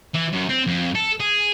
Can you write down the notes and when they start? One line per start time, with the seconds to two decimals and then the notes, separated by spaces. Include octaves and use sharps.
0.15 E3
0.33 F#2
0.49 C4
0.67 F2
0.95 A4
1.20 G#4